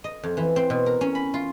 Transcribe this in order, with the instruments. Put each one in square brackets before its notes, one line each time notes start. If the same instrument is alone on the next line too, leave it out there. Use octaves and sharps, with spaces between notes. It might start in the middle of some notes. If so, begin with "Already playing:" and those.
[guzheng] D#5
F2
E3
C4
B2
A#4
C#4
B5
F4